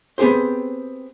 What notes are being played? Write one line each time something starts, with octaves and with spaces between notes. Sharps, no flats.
B3 C4 G4 G#4 C5